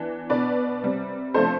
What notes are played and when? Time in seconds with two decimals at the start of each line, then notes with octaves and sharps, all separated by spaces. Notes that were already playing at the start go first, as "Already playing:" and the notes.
Already playing: E3 B3 D4
0.29 B2 B3 D4 B4 D5
0.83 C3 G3 C4
1.34 C3 F3 A3 D4 A4 C5